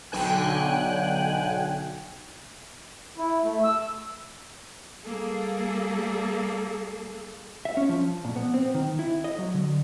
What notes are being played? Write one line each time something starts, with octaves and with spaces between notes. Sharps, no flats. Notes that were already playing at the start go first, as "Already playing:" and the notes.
B1 D3 G5 G#5 F#6
E4
A3
E6
G3 A#3 G#4 A4
E5
C#4
F3
A#2
B3
C4
D#3
E4
D#5
F#3
D3